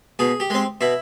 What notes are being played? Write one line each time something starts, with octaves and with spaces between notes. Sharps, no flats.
B2 G#4
G4
G#3 C4
B2 E4